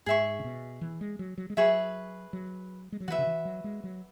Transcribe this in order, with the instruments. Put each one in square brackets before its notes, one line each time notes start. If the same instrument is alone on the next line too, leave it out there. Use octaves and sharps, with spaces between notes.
[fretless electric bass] G#2 [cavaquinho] G#4 E5 C#6
[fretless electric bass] C#3
B2
E3
G#3
F#3
F#3
G#3
[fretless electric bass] F#3 [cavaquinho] G#4 B4 E5 C#6
[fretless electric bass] F#3
G#3
F#3
[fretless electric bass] E3 [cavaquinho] F#4 B4 E5
[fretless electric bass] C#3
E3
F#3
G#3
F#3